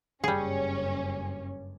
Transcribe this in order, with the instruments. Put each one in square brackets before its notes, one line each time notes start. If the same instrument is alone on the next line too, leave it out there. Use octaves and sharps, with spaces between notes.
[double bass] F#1 G2 [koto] G3 G#4 [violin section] C#4